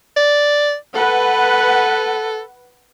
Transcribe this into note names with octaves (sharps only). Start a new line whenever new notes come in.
D5
A4 B4 F#5